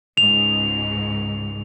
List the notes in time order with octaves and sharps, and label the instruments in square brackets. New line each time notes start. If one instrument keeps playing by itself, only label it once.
[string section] C#2 G#2 [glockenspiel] F7